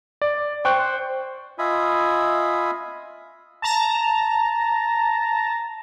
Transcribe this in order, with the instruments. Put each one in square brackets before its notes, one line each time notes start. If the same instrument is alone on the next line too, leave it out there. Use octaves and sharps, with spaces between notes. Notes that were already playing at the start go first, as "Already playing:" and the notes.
[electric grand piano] D5
[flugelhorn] C5 [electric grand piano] G5 C#6 F#6
[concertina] F4 D#5 E5 G#5 B5
[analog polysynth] A5 A#5